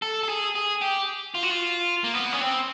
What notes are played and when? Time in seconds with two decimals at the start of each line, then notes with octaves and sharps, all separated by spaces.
0.02 A4
0.23 A4
0.29 G#4
0.55 G#4
0.82 G4
1.35 F4
1.43 F#4
1.50 F4
2.04 A#3
2.14 B3
2.33 C#4
2.41 C4